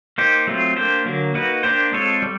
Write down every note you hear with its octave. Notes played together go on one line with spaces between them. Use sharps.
A#3 D#4 G4 C5
F#3 A3 C4 F4
A#3 D4 G4 C5
D3 F#3 A#3
A#3 D#4 F#4 B4
A#3 D4 G4 C5
G#3 C4 F4 A4 C#5
G3